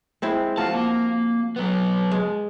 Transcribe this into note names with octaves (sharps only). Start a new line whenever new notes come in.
G#3 C4 E4
F3 F4 F#4 A5
A#3
F#3 B3
G#3